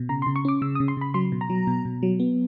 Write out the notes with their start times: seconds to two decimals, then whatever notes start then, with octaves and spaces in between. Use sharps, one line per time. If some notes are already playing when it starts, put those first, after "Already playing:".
Already playing: B2
0.09 C#3 A#5
0.22 C6
0.27 C#3
0.36 C#6
0.45 C#4 D6
0.62 C#3 E6
0.75 D#6
0.80 C#3
0.88 C6
0.97 C#3 B5
1.14 F#3 C6
1.32 B2
1.41 A#5
1.50 F#3
1.67 B2
1.85 B2
2.03 F#3
2.20 B3